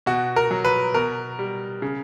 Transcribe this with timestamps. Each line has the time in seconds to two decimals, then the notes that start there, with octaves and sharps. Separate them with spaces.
0.06 B2 F#4
0.36 A#4
0.51 F#3
0.65 B4
0.94 B2 A#4
1.39 G3
1.82 C#3